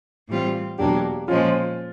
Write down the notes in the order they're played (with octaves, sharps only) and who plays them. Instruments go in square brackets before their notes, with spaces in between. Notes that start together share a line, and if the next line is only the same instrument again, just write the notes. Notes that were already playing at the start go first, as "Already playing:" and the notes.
[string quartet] A2 E3 G3 C4 F4
[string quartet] E2 B2 F#3 A#3 D4 [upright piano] G4
[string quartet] A#2 F3 G#3 C#4 [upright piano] F4